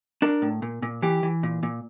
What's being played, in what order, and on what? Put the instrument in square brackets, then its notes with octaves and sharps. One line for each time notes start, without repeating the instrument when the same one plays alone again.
[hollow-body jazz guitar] D4 A#4
A2
A#2
A#2
E3 G4
E3
A#2
A#2